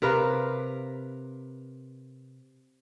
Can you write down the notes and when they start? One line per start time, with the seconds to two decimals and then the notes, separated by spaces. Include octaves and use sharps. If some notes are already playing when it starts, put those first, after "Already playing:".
0.02 C3 A#4 B4 F5